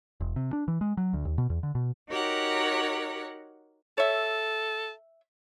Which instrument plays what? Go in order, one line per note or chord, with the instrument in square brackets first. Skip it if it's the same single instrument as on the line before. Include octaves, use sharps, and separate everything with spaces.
[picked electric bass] E1
C3
D4
E3
G#3
F#3
D2
D#2
B2
E2
D3
B2
[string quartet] D#4 F#4 G4 A#4 C#5 F#5
[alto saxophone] A4 [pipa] C#5 E5